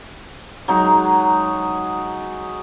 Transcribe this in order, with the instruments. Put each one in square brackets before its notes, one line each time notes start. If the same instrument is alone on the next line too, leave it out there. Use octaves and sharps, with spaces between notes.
[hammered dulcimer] F#3 G#3 D#4